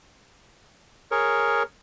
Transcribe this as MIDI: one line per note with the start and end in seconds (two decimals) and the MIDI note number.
1.11 1.63 68
1.11 1.63 70
1.11 1.63 73